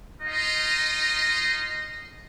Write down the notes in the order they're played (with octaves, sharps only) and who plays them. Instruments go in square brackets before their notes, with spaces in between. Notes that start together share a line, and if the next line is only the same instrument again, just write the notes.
[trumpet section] D#4 F4 D#5